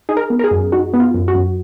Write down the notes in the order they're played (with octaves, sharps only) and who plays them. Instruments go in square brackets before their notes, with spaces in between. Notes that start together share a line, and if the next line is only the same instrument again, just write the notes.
[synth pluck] D#4 G#4
A#4
B3
A#4
G#4
F#2
D#4 F#4
B3
F4
F#2
F#4
F#2